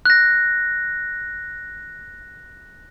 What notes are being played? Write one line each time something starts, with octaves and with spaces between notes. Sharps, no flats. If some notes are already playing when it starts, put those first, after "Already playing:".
F#6 A#6